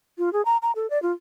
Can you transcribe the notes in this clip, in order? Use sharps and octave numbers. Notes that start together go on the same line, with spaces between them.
F4
G#4
A#5
A#5
A4
D5
F4